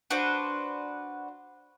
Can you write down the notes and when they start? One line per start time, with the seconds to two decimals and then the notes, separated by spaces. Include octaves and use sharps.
0.10 D4 F#4 B4 C5